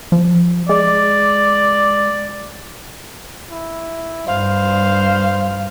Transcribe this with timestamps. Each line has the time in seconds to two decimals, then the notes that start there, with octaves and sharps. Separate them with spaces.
0.12 F3
0.69 G#3 D5
3.51 E4
4.27 G2 C5 F5